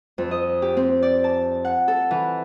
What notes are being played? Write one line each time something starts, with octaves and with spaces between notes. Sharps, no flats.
F2
D#5
G4
C4
D5
A5
F#5
A4
E3